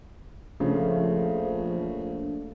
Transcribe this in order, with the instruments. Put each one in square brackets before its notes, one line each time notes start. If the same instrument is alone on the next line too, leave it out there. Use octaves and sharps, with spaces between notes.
[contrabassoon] A#1 [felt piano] C#3 [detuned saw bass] F3 [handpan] A3 A#3